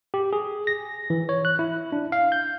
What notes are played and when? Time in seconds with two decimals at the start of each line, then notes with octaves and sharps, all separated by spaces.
0.14 G4
0.33 G#4
0.67 A#6
1.10 E3
1.29 C#5
1.45 F#6
1.59 E4
1.92 D4
2.12 F5
2.32 G6